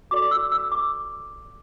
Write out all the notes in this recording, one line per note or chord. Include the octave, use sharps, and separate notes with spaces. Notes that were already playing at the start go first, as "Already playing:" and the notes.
F#4 A4 D5 D6
E6
E6
D6